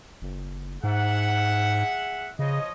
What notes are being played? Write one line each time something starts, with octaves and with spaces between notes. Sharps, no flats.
F#1
G#2 G#4 E5 F#5
C#3 F3 C#5 D#5